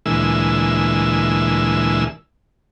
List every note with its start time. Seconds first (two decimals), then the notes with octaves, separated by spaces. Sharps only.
0.06 D2 A#2 E3 G#3 E6